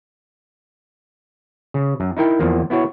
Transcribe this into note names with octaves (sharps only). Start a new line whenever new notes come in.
C#3
F#2
D#4 E4 A#4 G5
E2 F3 A#3
B3 E4 F#4 C#5